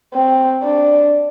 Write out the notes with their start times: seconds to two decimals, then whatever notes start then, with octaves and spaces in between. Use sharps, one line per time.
0.14 C4
0.64 D4